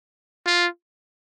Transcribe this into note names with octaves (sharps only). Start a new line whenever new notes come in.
F4